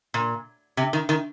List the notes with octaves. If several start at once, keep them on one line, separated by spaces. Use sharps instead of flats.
A#2
C3
D#3
D#3